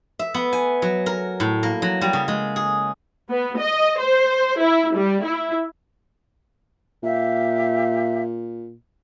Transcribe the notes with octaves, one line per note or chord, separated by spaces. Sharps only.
E5
B3
G#5
F#3
A#4
A2
A#3
F#3
G3
C#3
G#3
G#4
B3
D#5
C5
E4
G3
E4
A#2 G4 E5 F5